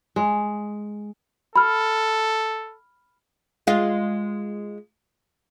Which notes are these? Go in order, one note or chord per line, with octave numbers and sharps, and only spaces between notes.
G#3
A4 B5 F6
G#3 F4